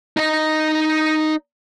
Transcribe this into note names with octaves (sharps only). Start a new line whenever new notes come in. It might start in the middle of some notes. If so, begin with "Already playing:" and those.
D#4 D#5